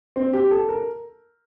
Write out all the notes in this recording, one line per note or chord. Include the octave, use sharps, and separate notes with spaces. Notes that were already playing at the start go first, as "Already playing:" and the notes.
C4
G4
A4
A#4